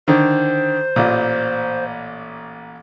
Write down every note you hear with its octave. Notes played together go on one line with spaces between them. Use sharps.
D3 D#3 C5
A1 A#2